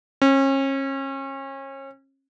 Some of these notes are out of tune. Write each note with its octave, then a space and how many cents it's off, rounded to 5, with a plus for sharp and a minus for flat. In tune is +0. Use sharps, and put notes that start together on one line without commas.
C#4 -35